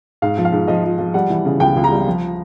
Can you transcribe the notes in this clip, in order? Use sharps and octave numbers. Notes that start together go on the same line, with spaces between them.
G#2 F5
F3
F5
G#2
F3 D#5
F3
F3
G3 F#5
E3
C#3
C#2 G5
C#2
A#5
G3
F3